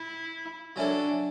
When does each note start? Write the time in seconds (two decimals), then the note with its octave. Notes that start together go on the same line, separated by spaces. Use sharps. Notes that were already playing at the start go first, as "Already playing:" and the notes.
Already playing: E4
0.76 F#3 C#4 D4 E4 A4